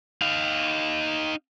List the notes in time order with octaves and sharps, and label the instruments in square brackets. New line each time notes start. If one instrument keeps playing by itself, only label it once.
[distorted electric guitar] D#4 F5